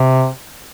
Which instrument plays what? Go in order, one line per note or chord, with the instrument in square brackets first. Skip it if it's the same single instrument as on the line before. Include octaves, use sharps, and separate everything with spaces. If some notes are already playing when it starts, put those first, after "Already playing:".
Already playing: [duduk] C3